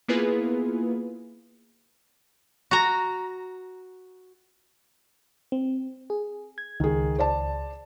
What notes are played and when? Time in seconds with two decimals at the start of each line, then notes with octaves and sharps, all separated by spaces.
0.08 A#3 B3 E4 F4 G#4 B4
2.71 F#4 A#5
5.52 C4
6.10 G#4
6.58 G#6
6.80 C#2 D#3 G#4
7.18 C5 D5 A5